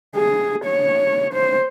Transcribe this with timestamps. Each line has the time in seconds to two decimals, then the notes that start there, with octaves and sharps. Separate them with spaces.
0.16 G#4
0.65 C#5
1.34 C5